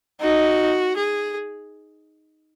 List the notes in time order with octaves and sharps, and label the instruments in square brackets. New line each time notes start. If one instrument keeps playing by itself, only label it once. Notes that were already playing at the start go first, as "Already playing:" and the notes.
[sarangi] D#4 [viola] F#4
[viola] G#4